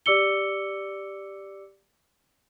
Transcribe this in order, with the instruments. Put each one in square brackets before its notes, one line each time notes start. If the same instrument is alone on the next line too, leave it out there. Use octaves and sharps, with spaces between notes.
[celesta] G4 D5 D6 E6 C#7 G7